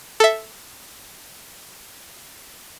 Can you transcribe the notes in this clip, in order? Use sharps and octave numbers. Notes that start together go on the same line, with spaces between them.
A4 E5